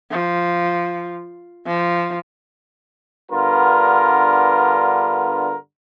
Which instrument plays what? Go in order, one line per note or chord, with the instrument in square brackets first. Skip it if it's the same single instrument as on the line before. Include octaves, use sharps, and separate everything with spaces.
[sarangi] F3
F3
[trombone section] G2 D3 B3 F4 A#4